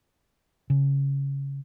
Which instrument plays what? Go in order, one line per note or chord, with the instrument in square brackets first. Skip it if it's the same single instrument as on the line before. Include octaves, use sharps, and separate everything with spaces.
[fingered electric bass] C#3